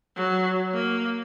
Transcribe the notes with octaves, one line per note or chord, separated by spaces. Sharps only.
F#3
A#3